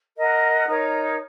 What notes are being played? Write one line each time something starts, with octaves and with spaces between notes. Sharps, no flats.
A#4 D#5 F#5
D#4 A#4 C#5